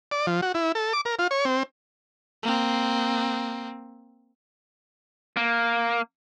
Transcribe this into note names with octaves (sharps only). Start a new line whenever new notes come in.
D5
F3
F#4
E4
A4
D6
A#4
F4
C#5
C4
A#3 C4
A#3